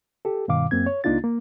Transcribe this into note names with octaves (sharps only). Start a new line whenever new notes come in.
G4 A4
G2 B2 D#3 F5 D6
F#2 A#3 C4 G#6
C#5
C#2 A#3 D4 D#4 F4 A6
A#3